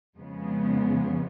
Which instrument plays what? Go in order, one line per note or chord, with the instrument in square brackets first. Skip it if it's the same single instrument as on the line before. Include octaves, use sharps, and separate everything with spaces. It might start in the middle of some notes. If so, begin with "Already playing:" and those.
[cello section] F2 C#3 F3 G#3 B3